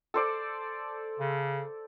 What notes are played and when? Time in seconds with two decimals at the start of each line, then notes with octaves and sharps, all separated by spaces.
0.14 A4 C5 D5
1.19 C#3